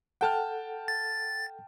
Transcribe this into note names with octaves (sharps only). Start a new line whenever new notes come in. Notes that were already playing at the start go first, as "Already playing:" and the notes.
A4 F#5 G5 A5 F6
A6